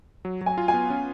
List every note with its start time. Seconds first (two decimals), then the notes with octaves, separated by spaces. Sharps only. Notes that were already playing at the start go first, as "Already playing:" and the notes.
0.25 F#3
0.41 F#3
0.46 G#5
0.58 F4
0.68 G#5
0.74 B3
0.90 C#4